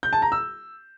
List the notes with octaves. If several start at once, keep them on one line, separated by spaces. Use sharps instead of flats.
G6
A5
A#5
E6